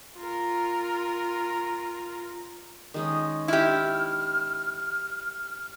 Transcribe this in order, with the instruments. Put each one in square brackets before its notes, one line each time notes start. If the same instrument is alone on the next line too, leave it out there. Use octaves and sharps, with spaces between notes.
[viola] F4 A#4
[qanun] D#3 G#3 C#4 [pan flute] D#6
[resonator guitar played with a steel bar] E4 G4 [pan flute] F6